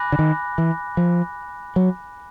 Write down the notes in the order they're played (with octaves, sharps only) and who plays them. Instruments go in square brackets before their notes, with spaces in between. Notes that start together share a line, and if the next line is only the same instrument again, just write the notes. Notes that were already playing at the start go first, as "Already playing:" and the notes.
Already playing: [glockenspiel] G#5 B5 D6 F#6 A#6
[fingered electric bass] D3
D#3
E3
F3
F#3